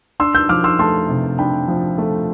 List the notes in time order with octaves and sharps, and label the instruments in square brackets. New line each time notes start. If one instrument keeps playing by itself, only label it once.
[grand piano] D4 C6 E6
E6 G6
F3 D6 F6
C6 E6
A3 A5 C6
C3
D4 G5 B5
F3
A3